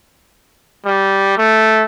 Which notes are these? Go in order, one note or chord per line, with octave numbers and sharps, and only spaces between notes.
G3
A3